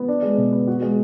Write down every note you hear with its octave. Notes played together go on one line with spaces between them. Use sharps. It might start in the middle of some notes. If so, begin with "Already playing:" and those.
Already playing: B3
D4
G#3
B2
B3
F#4
G#3